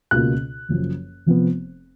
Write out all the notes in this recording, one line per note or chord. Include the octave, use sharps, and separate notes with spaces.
C#2 B2 A#3 F4 F#6
F#1 F#2 F3
F1 F2 F3 B3